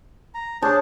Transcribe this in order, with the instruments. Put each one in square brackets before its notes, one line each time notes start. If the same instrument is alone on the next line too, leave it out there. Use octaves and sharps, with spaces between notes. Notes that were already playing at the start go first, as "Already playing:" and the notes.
[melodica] A#5
[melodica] D4 G#4 C5 [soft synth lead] C#5 [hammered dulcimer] A5